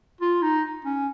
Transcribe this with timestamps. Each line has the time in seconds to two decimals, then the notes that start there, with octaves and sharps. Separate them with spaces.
0.21 F4
0.42 D#4
0.85 C#4